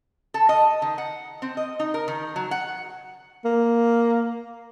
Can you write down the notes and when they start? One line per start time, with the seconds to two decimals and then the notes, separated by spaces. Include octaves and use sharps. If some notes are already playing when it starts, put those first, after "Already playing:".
0.34 A4
0.49 D#5
0.82 D#3
0.98 F#5
1.42 C4
1.57 D#5
1.80 D#4
1.94 A#4
2.08 D#3
2.36 F#3
2.51 F#5
3.45 A#3